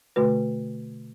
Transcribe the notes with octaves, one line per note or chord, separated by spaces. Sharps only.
B2 D3 A3 F#4 B4